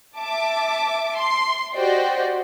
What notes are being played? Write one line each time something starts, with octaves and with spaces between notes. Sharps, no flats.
E5 A5 D6
C6
F#4 G4 C5 D5 D#5 G5